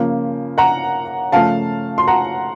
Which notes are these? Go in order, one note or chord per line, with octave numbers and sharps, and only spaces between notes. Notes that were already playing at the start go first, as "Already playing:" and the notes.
Already playing: C#3 F3 A#3
F#5 A#5
C#3 F3 A3 F5 A5
C6
F#5 A#5